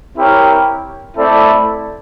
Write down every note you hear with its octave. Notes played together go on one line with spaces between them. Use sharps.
C4 E4 G4 A#4 C#5
A3 C4 E4 A4 D5